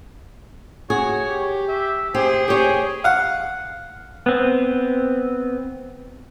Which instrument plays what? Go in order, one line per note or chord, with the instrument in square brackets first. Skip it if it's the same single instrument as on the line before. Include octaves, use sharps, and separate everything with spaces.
[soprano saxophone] F#4 [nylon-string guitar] G#4 [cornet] C#5
[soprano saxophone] G4
[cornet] E5
[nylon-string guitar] G4 [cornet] G#4 [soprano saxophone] C5
[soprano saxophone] G4 [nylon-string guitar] C5 C#5
[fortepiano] F5 F#5
[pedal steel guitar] B3 C4